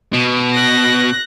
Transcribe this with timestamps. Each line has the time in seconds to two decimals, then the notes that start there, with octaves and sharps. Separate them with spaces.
0.13 B2
0.52 F#6 A#6